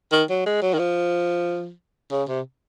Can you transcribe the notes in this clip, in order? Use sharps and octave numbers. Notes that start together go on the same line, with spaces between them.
D#3
F#3
G#3
F#3
D#3
F3
C#3
C3